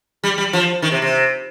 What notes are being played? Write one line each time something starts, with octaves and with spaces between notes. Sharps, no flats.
G3
G3
F3
D#3
C3
C3